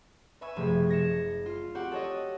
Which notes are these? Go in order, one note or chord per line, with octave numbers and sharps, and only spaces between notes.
B4 E5 G#5 C#6 E6
F#1 C3 F3 A3 G#6
G#6 A#6 C#7 E7
F4
C4 F#4 G4 F#5
A4 C#5 D#5